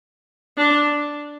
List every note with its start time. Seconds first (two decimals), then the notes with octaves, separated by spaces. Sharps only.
0.57 D4